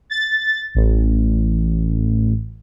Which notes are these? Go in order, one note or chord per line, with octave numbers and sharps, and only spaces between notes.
A6
A1